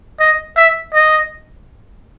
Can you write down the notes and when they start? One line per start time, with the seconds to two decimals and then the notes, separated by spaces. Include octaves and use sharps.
0.20 D#5
0.57 E5
0.94 D#5